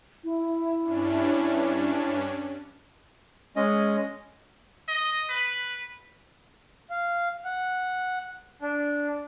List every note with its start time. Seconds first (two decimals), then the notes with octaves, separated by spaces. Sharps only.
0.24 E4
0.82 G2 C#4 D4
3.56 G#3 C#4 D#5
4.88 D#5
5.30 B4
6.90 F5
7.45 F#5
8.62 D4